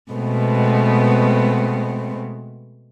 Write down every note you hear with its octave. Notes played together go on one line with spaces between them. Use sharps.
B2 G#3 A3 B3 C4